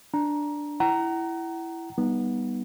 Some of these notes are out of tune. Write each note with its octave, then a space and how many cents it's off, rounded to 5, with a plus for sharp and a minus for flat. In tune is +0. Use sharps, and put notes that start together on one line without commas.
D4 +0 A#5 +15
E4 +10 F#5 +40 A#5 +0
G3 +0 B3 -15 D#4 +0